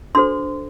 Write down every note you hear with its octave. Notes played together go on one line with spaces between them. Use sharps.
D4 F#4 A4 C5 C6